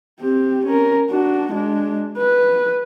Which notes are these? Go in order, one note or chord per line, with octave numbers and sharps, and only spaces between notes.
C4 G4
C#4 A#4
D4 F#4
G#3 D4
B4